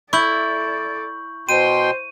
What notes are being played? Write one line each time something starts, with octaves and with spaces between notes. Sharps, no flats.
E4 A4 D5 C#6 G6 F#7
B2 C5 G5 C6 D#7